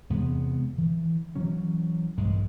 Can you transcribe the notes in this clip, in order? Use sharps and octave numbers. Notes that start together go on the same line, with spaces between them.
E2 C3 G#3 B3
E3
E3 F#3 C#4
A#1 G2 G#3